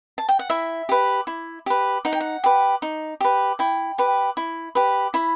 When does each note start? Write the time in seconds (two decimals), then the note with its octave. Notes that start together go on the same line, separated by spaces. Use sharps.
0.18 A5
0.29 G5
0.39 F#5
0.50 E4 E5
0.89 G4 B4
1.27 E4
1.66 G4 B4
2.05 D#4 F#5
2.13 G5
2.20 F#5
2.44 G4 B4
2.82 D#4
3.21 G4 B4
3.59 E4 G5
3.98 G4 B4
4.37 E4
4.75 G4 B4
5.14 E4 B5